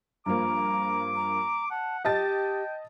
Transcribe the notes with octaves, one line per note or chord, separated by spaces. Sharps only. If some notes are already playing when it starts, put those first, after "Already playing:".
G2 F3 A#3 A#5 D6
A#5
F#5 A5
G4 D#5 G5 A5 A6